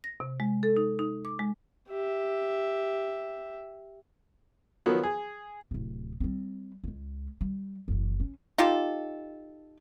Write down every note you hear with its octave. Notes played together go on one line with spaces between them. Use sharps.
A#6
C3
G#3
A4
D#4
D#4
D6
G#3
G4 E5
D#3 F3 F#3 B3
G#4
D1 C3
G3 C4
C#2 G#3
G3
F#1 E3
C#4
D#4 F4 G4 A4